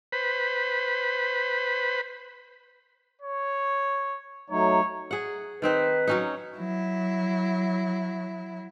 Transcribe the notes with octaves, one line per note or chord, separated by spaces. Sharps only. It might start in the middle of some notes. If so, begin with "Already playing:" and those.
B4 C5 B5
C#5
F#3 A3 D#4 C#5
G#4 F#5
D#3 C4 D#4 B4
F#3 C#4 D#4
F#3 E4